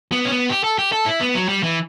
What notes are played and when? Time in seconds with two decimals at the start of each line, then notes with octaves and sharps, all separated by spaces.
0.12 B3
0.25 C#4
0.31 B3
0.49 G4
0.64 A4
0.78 G4
0.92 A4
1.06 E4
1.21 B3
1.35 F#3
1.49 G3
1.63 E3